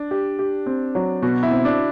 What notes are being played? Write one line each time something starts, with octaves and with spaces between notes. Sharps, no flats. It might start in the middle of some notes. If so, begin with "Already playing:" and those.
Already playing: D4
G4
G4
C4
F#3
B2 F#4
E4
C4
D4